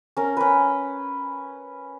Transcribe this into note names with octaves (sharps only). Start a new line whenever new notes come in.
C#4 A#4
C#4 B4